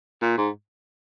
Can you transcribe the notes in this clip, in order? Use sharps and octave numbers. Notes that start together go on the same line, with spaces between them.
A#2
G#2